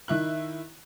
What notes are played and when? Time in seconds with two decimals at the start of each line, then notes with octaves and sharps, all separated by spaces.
0.08 D#3 E4 F#6